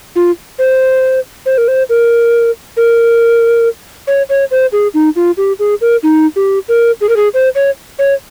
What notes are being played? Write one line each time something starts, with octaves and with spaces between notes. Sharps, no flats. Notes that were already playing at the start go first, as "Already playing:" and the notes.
F4
C5
C5
A#4
C5
A#4
A#4
C#5
C#5
C5
G#4
D#4
F4
G4
G#4
A#4
D#4
G4
A#4
G#4
A#4
G#4
C5
C#5
C#5